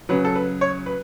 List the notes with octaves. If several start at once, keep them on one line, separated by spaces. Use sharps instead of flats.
C#3 F#3 B4
A4
B4
C#5
B4